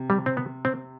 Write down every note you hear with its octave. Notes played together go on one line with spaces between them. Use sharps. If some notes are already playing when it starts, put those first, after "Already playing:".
Already playing: C3
G3
C4
B3
C4